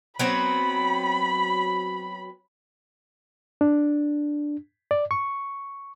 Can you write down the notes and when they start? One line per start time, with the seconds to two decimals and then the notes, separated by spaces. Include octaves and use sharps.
0.19 F#3 B3 C4 B5
3.61 D4
4.91 D5
5.11 C#6